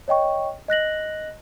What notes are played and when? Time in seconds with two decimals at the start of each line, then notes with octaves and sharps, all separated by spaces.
0.08 C#5 D#5 G5 C#6
0.68 D#5 F#6 A#6 F#7